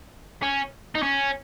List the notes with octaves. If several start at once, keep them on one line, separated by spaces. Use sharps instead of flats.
C#4
D#4
C#4